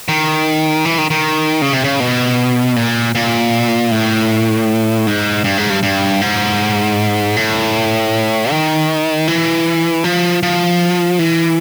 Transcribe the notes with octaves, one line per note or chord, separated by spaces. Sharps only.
D#3
E3
D#3
D#3
C#3
C3
C#3
B2
A#2
A#2
A2
G#2
G2
G#2
G2
G2
G#2
A2
D#3
E3
F3
F3
E3